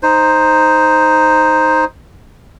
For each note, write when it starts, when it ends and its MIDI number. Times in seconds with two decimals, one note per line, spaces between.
0.03 1.85 63
0.03 1.85 72